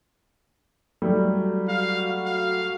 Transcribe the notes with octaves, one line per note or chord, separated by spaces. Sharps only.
F#3 G3 A3
F#4 F5
F5